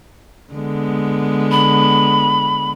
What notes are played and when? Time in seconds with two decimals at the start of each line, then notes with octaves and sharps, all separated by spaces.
0.53 D3 G#3 B3
1.51 B5